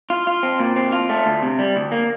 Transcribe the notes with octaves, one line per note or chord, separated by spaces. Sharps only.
F4
F4
C4
A#2
C4
F4
A3
D2
C3
G3
D2
A#3